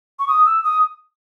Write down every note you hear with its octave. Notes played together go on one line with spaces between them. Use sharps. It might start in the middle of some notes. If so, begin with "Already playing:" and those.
C#6
D#6
E6
D#6